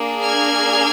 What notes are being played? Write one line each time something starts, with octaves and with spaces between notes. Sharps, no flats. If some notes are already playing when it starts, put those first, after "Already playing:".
Already playing: A#3 D4 G#4
F6 G#6